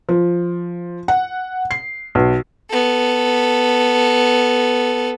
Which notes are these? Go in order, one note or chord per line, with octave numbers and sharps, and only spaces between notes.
F3
F#5
C7
B1
B3 A4